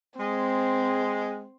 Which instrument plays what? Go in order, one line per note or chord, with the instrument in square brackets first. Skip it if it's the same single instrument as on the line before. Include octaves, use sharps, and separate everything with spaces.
[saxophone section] G#3 [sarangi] C4